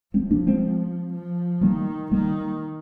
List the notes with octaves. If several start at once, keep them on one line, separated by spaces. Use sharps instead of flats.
F3 G#3 C4
A#3 D4
G#3 C4
F3
D#3 G3 A#3
D#3 G3 A#3